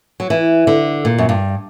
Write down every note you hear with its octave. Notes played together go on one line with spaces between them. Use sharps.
F#3
E3
D3
A#2
F#2
G2